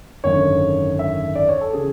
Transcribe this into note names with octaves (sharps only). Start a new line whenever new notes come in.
G#1 F#2 D3 C#5
E5
D5
C#5
A4
C#3 E3 G#4